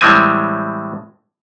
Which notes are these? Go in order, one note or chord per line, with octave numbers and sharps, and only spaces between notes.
A2 E3 G3 G#3 C4 G#5